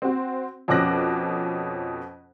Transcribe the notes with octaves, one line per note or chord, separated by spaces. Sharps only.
C4 F#4
F2 B2 C#4 D6 F#6 A#6